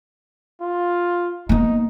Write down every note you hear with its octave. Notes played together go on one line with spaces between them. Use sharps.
F4
A#3 B3 D#4